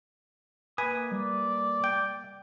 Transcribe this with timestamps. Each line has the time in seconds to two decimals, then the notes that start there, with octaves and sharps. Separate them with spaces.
0.78 A#3 B4 E5 G#5 D#6
1.12 G3 D5
1.84 G5